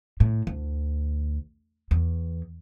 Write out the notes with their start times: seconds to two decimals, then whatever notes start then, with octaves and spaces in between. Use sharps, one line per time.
0.20 A2
0.47 D2
1.91 E2